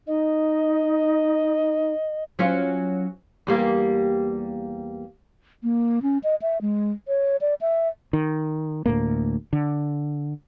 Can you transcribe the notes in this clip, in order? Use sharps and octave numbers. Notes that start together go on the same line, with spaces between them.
D#4 D#5
F#3 C#4 F4
E2 G3 A#3
A#3
C#4
D#5
E5
G#3
C#5
D5
E5
D#3
D2 A2 A#3
D3